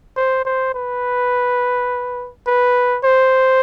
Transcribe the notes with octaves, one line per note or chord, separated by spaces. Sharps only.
C5
C5
B4
B4
C5